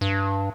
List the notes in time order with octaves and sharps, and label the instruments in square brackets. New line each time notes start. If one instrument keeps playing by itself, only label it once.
[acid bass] G2